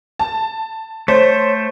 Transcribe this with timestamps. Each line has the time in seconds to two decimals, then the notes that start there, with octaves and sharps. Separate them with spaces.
0.19 A5
1.08 A3 C5 C#5